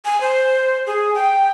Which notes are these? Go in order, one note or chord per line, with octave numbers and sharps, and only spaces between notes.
G#5
C5
G#4
G5